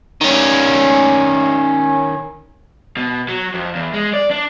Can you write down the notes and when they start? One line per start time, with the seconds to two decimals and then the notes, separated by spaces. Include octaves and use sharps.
0.21 D#3 C#4
2.97 B2
3.29 F#3
3.54 F2
3.75 E2
3.94 G#3
4.14 D5
4.31 D4